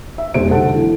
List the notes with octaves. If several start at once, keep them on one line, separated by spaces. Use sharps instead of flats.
E5
F1 C3 G#3 C5 D7
B1 D3 A4 F#5 A5
E3